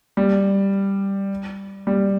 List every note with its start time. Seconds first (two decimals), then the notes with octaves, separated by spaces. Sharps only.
0.17 G3
1.87 G3